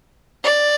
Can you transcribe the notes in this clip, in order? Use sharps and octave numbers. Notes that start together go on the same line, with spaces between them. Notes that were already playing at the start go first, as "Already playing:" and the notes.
D5